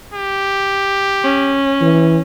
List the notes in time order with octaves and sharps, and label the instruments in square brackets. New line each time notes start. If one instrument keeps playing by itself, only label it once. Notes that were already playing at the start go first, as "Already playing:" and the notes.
[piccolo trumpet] G4
[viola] C#4
[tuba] E3